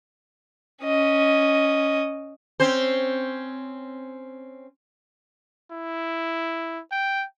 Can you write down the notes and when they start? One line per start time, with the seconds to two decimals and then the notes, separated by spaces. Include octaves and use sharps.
0.84 C#4 D#5
2.60 C4 C#4 C5
5.72 E4
6.92 G5